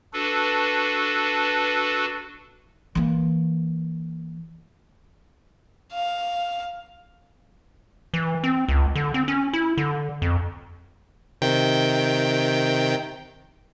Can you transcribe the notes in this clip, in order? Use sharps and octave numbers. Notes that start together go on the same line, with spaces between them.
D4 F#4 A4 B4
E3 A#3
F5
E3
C4
C#2
D3
C4
C#4
E4
D3
F2
C3 D#3 G5